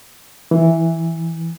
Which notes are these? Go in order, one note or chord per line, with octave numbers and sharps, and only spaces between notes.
E3